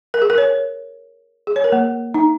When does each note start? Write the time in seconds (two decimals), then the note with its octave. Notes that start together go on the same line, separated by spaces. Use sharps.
0.14 A#4
0.22 G#4
0.30 A#4
0.38 C#5
1.47 G#4
1.56 C#5
1.64 A#4
1.72 A#3
2.14 D#4